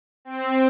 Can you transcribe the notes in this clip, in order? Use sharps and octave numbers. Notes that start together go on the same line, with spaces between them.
C4